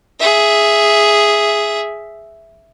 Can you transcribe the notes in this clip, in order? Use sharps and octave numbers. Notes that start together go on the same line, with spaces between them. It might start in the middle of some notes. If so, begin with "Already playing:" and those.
G#4 E5